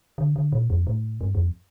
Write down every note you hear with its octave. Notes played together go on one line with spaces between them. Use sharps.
D3
D3
A#2
F2
A2
G2
F2